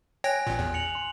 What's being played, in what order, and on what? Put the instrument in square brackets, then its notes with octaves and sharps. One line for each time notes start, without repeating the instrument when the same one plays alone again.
[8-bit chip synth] C#5 G5 A#6 [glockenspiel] G#5 F#6
[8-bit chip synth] A1 A#2
E2
[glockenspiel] C#7 F7 F#7
C6